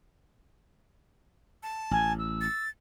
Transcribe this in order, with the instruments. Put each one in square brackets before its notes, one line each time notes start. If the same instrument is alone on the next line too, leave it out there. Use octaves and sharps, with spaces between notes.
[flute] A5
[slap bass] A1 [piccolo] G#5
[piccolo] E6
[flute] A6